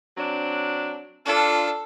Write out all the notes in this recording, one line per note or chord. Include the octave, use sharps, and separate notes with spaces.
F#3 C4 D4
D4 F4 A4